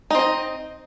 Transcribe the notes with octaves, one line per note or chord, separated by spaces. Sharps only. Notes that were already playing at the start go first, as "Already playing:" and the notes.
C4 D#4 D#5